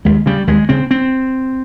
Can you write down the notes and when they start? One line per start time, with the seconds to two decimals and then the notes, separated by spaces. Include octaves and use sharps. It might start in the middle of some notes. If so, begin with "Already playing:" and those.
0.05 D#2 G#3
0.26 C#3 G3
0.47 D#2 G#3
0.69 C#3 C4
0.91 C4